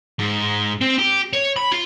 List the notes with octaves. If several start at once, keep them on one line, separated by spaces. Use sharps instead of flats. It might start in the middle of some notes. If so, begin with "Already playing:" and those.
G#2
C4
G4
C#5
B5
F4